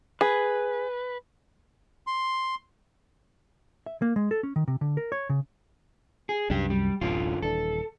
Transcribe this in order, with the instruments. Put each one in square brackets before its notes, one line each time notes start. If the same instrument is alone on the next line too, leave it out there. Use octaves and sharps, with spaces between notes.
[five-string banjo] G#4 [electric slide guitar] B4
[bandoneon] C6
[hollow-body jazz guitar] E5
A#3
G#3
A4
C#4
D#3
C3
D3
A#4
C#5
C#3
[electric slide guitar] G#4
[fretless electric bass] C2 F#2 [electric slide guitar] D4 G4
[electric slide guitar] G3
[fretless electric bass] D1 A1 [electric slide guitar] F#2 D3 F4
[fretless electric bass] D#1 E3 D4 [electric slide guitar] A4